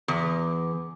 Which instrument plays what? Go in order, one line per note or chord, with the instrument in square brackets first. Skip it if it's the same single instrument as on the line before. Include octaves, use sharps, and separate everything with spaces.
[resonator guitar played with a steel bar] E2